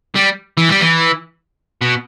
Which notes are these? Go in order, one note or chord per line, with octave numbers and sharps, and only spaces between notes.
G3
E3
G3
E3
B2